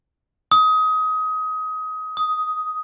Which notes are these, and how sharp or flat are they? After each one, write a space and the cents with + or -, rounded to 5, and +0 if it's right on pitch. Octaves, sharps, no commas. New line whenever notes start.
D#6 +25
D#6 +10